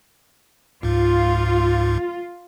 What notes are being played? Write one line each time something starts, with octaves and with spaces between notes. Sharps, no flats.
C#2 G#2 F4